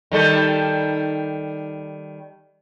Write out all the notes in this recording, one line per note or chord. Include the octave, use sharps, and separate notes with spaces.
D#3 G3 A4